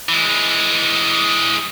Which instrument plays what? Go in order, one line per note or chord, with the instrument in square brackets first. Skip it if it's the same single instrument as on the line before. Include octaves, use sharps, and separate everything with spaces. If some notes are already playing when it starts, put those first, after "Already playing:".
[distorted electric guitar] E3 G#3